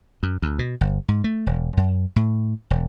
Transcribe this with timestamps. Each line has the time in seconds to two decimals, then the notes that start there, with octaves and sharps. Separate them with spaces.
0.23 F#2
0.42 D2
0.59 B2
0.81 G1
1.08 G#2
1.24 A3
1.46 E1
1.77 F#2
2.16 A2
2.70 E1